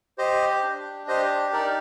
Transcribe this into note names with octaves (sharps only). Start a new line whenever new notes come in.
G4 C5 D#5
D4
G4 C5 D#5
D#4 A#4 D5